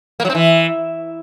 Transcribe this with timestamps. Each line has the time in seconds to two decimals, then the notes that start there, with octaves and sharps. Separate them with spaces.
0.20 A#3
0.25 F#3
0.30 C4
0.35 E3